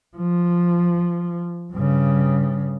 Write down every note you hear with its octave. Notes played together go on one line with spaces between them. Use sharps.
F3
G2 C#3